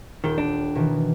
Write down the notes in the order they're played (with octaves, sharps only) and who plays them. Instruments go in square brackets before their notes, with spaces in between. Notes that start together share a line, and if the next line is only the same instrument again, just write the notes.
[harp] D#1 G5 [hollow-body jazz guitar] D#3
[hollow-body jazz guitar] D4
[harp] B2 D#3 E3